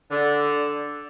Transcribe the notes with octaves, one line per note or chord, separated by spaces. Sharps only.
D3